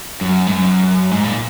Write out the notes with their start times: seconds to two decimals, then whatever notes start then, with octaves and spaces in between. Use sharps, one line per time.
0.21 F#2
0.47 G#2
0.51 F#2
1.11 G#2
1.24 A#2